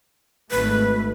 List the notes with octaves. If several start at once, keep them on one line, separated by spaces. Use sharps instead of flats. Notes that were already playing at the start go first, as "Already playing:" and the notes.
G#1 A3 B4